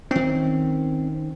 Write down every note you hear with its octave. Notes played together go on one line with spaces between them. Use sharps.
D#3 C4 C#4